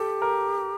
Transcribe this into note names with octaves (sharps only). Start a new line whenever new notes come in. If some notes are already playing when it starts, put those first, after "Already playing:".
Already playing: G4 A4
A#4